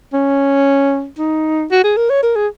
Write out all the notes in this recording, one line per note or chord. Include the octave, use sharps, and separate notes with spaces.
C#4
D#4
F#4
G#4
A#4
C#5
A#4
G#4